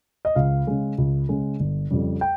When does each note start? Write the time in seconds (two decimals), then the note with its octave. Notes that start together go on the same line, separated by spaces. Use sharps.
0.25 D#5
0.36 C#2 F5
0.67 C#3 G#3
0.98 C#2
1.29 C#3 G#3
1.60 G1
1.91 F2 C#3 G3
2.21 G5